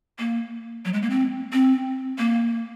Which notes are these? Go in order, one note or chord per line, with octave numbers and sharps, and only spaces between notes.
A#3
F#3
G#3
A#3
C4
C4
A#3